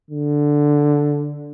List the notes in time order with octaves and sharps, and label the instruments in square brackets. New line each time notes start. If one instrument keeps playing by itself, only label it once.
[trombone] D3